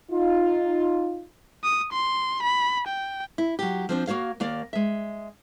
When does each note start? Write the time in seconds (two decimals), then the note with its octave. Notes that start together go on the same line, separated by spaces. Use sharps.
0.11 D#4 F4
1.64 D#6
1.93 C6
2.43 B5
2.88 G5
3.38 E4
3.59 F#3 G4
3.89 F3 C4 D4
4.07 A#3 F#4 C#5 F5
4.40 D#2 A#3 D5
4.73 G#3 E5